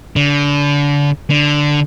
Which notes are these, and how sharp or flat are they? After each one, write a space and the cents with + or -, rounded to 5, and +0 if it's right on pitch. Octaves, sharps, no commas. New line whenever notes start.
D3 -30
D3 +0